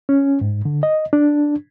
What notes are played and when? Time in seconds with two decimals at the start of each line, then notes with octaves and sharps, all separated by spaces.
0.09 C#4
0.41 G#2
0.65 D3
0.83 D#5
1.13 D4